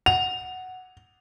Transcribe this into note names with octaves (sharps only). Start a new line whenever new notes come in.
F#5 F7